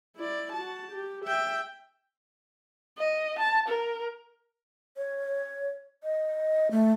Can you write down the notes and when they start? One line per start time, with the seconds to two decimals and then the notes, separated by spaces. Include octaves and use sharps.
0.16 E4 D5
0.53 F#4 A5
0.92 G4
1.25 E5 G5
2.98 D#5
3.39 A5
3.68 A#4
4.97 C#5
6.03 D#5
6.71 A3